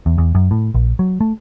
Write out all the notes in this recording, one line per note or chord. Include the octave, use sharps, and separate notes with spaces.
E2
E2
F#2
A2
A#1
F#3
A3